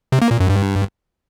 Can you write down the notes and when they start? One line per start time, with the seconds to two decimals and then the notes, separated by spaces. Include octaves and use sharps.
0.12 C3
0.22 A#3
0.31 A#2
0.40 F#2
0.49 G2